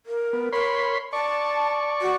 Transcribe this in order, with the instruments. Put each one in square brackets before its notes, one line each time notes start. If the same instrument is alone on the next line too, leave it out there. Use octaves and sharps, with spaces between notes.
[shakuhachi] A#4
[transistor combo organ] B3
[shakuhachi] A#4 [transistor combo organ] C#5 B5 C6
[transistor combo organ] D5 C#6 [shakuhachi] A5
[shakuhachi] F#4